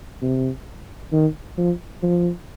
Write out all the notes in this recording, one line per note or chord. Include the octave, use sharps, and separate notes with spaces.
C3
D#3
F3
F3